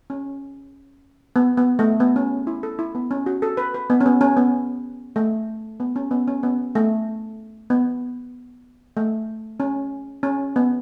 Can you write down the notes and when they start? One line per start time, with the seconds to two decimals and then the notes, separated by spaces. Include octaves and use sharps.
0.10 C#4
1.36 B3
1.57 B3
1.79 A3
2.00 B3
2.16 C#4
2.47 E4
2.63 A4
2.79 E4
2.95 B3
3.11 C#4
3.26 F#4
3.42 A4
3.57 B4
3.74 B4
3.90 B3
4.01 C#4
4.06 B3
4.21 C#4
4.37 B3
5.16 A3
5.80 B3
5.96 C#4
6.11 B3
6.28 C#4
6.43 B3
6.75 A3
7.70 B3
8.97 A3
9.60 C#4
10.23 C#4
10.56 B3